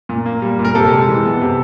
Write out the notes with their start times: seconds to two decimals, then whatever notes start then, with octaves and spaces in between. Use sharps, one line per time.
0.09 A#2
0.26 A#3
0.42 G3
0.59 A#2
0.65 A#4
0.75 C3 A4
0.92 G#3
1.08 E3
1.25 B3
1.42 C3